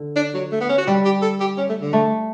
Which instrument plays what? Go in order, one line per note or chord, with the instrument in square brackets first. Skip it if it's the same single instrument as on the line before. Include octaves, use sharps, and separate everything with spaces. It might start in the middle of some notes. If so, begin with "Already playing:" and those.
Already playing: [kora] D3
[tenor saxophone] D4
F#3
A3
B3
C#4
F#4
[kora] G3 [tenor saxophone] G4
[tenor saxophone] G4
A4
G4
C#4
A3
D3
[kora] A3